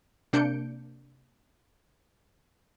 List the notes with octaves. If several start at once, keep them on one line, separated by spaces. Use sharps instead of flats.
C3 A#3 D4 G6 C#7 D7